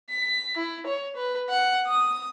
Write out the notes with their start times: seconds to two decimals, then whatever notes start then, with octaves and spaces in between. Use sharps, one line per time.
0.10 B6
0.57 E4
0.86 C#5
1.16 B4
1.49 F#5
1.87 D#6